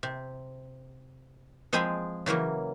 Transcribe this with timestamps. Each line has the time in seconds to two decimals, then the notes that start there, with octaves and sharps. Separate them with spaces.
0.03 C3
1.73 F3 G#3 C4 G#4 G#5 B5
2.26 C#3 E3 F#3 A#3